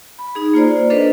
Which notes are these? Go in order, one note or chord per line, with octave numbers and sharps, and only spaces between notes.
B5
D#4 G#4
A#3 F4 C5 D5
D4 A4 B4 C5 D#5